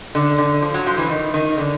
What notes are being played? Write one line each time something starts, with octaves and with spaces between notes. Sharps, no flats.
D3
D3
F3
F#3
F3
E3
D#3
D#3
D3